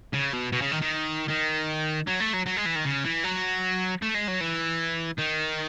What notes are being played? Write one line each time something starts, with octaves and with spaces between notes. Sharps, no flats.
C#3
B2
B2
C#3
D#3
D#3
D#3
F#3
A3
F#3
F#3
G#3
E3
D#3
C#3
E3
F#3
A3
G#3
F#3
E3
D#3